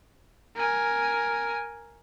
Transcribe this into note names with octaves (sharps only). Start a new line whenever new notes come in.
A#4 G#5